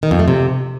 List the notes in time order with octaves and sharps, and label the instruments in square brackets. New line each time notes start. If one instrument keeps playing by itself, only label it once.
[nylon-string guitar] D#3
F2
A3
C3